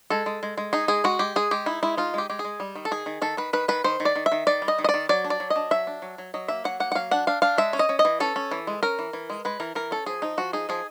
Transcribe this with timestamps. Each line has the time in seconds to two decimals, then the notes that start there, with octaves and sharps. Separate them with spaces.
0.10 G#3 A4
0.26 G#3
0.43 G#3
0.57 G#3
0.73 D#4 G#4
0.88 G#3 G#4
1.04 G#3 F#4
1.19 G#3 G4
1.36 G#3 G#4
1.51 G#3 G4
1.66 D#4 E4
1.83 G#3 E4
1.97 D#4 F4
2.14 G#3 G4
2.30 G#3 G4
2.39 G#4
2.44 G#3
2.60 G3
2.75 D#3
2.85 A4
2.91 D#3 G#4
3.06 D#3
3.22 D#3 A4
3.37 D#3 B4
3.53 D#3 B4
3.68 D#3 B4
3.84 D#3 C5
4.00 D#3
4.05 D5
4.16 D#3
4.26 E5
4.32 D#3
4.47 D#3 D5
4.62 G3
4.68 D#5
4.78 D#3
4.84 D#5
4.89 D5
4.94 D#3
5.09 F#3 D5
5.24 D4
5.30 D5
5.40 F#3
5.50 D#5
5.56 D4
5.71 F#3 E5
5.87 D4
6.02 F#3
6.18 F#3
6.34 F#3 D#5
6.48 A#3 E5
6.64 F#3 F#5
6.80 A#3 F#5
6.92 F#5
6.95 F#3 F5
7.11 D4 F#5
7.27 D4 F5
7.42 D4 F5
7.58 G#3 E5
7.73 C#4
7.79 D#5
7.89 C#4
7.99 D#5
8.05 E3
8.20 C#4 A4
8.36 C#4
8.51 E3
8.67 G#3
8.83 C#4 A#4
8.99 E3
9.13 E3
9.30 G#3
9.45 G#3 B4
9.60 E3 A#4
9.75 E3 A#4
9.91 C#4 A4
10.06 F3 G#4
10.22 F3 D#4
10.37 F3 F#4
10.53 D#4 G#4
10.69 F3 G#4